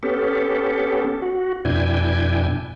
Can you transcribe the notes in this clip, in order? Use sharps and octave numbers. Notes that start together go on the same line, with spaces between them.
B3 C#4 G4 A4
F#4
F2 B2 D4 E4 G5 G#5